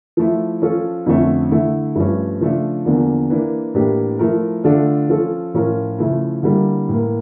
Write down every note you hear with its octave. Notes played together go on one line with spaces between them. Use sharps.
F3 A3 E4
F3 C#4 F4 A4
F2 D3 F3 A3 C#4
D3 A3 E4
G2 F3 A3 C#4
C#3 F3 A3 D4 F4
E2 D3 F3 A#3 D4
E3 A#3 D4
A2 E3 A#3 D4 G4
F3 A3 E4 A#4
D3 A3 D4 F4 A4
F3 C#4 F4 A4
A2 F3 C#4 F4 A#4
C#3 F3 A3 E4
D3 G3 A#3 E4
A2 E3 A#3